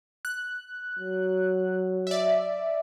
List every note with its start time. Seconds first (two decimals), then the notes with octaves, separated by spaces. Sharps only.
0.25 F#6
0.99 F#3
2.07 D5 E5